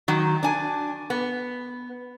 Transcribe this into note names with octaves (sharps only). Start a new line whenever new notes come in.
D#3 F#3
D4 G#5
B3